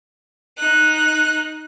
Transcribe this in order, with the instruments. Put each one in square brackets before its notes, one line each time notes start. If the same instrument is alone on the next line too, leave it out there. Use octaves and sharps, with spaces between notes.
[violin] D#4 F#6